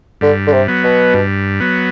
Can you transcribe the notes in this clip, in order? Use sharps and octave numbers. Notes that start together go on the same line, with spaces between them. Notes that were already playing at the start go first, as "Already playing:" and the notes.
G2 D3
D3
C3
F#3 B3
B2
G2
F#3 B3